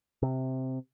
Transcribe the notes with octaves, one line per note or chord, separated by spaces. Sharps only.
C3